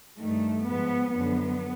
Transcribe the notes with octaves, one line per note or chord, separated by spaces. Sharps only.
G2 D#3 A3
G#2 F3 B3
F#2 D3 F3 B3